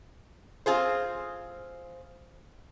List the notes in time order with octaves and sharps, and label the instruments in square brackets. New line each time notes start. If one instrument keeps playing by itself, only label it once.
[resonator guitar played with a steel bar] C4 F4 G#4 C5